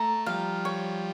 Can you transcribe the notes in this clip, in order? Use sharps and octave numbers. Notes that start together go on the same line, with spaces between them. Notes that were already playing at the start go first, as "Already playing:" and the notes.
Already playing: A3 A#5
F3 G3 F5
C#5